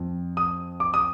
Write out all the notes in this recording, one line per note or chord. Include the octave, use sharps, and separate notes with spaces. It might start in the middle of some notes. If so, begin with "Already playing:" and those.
Already playing: F2
D#6
D6
D#6